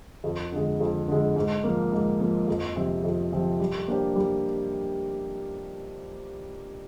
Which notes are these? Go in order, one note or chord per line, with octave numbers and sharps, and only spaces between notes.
F2
D3 G#3
F2
D3 G#3
G#2
F3 A#3
G#2
F3 A#3
F2
C3 F3 C4
F2
C3 F3 C4
G3
A#3 D4 G4 C5
G3